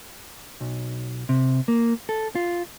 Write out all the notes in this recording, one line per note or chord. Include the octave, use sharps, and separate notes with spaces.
B1
C3
A#3
A4
F4